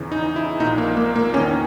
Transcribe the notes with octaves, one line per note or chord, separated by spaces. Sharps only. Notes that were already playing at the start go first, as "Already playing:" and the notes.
Already playing: E2 C#3 E3
D#4
E4
A#1 A#2 D#4
A#3
A#3
A#3
E2 D#3 C#4